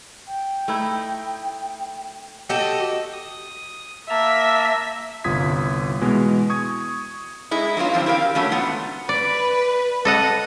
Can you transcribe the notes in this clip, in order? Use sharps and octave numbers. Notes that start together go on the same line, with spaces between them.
G5
A3 D#4 E4
F#4 G4 A4 D#5
D#6
A#3 E5 A5 A#5
G1 C2 F4 D#6 G#6 B6
B2 E3 G#3 B3
C#6 D#6 G#6
G#3 D#4 E4
F#3 B3 C#4 F4
G#2 D3 F3 C4 C5
E4 G4 A#4 D5 F5
C#3 F#3 A3 C#4
G#2 A3 B3 F4 F#5
B4 D5
A4 D#5 F#5